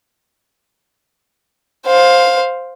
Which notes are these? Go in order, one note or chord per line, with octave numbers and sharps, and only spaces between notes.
C5 F5